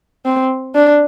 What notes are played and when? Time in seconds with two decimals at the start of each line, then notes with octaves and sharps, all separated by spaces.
0.26 C4
0.75 D4